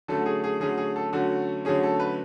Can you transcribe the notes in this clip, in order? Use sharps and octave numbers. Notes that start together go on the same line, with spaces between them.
D3 F#3 A3 C#4 A4
G#4
G#4
D3 F#3 A3 C#4 G#4
G#4
A4
D3 F#3 A3 C#4 F#4
D3 F#3 A3 C#4 G#4
A4
B4